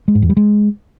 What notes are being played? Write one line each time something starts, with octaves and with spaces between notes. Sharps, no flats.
G#3
G#2
E2
G3
G#3